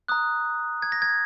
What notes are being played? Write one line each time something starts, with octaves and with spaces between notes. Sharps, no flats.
A#5 D#6 F#6
G#6
A#6
G#6